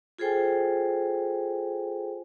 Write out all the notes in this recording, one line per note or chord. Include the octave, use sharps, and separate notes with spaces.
F4 G#4 A4 C5 G5 G#5